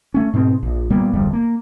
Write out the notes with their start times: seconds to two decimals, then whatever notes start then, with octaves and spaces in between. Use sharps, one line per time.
0.14 A3 C#4
0.33 G#2 B2 C4
0.63 A#1
0.90 A#2 G3 A#3 B3
1.14 D1 G1 F2 G3
1.33 A#3